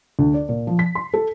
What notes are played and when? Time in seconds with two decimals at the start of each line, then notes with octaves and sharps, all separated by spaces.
0.19 D2
0.34 D5
0.49 A#2
0.67 F3
0.79 B6
0.95 C6
1.14 A4